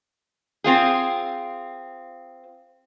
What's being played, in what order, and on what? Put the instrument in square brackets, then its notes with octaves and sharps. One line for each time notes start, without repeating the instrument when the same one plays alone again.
[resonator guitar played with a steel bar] C4 F4 G#4